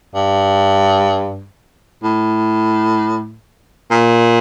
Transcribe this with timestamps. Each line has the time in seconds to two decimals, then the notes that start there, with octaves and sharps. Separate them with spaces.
0.15 G2
2.04 A2
3.91 A#2